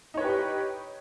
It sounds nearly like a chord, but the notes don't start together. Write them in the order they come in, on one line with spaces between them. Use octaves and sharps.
D#4 C#5 B4 G4